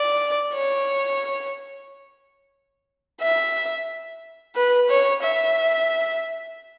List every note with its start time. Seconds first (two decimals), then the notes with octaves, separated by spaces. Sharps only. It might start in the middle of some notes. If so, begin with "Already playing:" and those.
Already playing: D5
0.54 C#5
3.21 E5
4.56 B4
4.89 C#5
5.23 E5